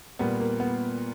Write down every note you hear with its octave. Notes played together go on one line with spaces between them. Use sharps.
A#2 G3 B3
A#3
B3